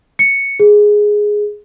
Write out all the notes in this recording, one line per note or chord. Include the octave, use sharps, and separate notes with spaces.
C#7
G#4